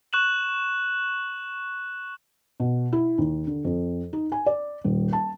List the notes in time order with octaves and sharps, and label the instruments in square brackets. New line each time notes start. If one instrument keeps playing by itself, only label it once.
[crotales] C#6 F#6 E7 F#7
[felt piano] B2
E4
D#2
D3
F2
D#4
G#5
D5
D#1
A5